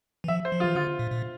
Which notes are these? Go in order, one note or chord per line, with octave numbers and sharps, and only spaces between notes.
E3
F3 E5
C5
F3
F4
E3
D3 F4
A#2
A#2